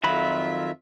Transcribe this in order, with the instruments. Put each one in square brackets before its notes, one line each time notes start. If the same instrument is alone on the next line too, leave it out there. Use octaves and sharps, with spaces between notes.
[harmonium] F2 F4 E5 [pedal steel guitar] D#3 F#3 B5